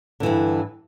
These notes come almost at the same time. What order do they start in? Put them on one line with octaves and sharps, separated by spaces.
D3 E3 G2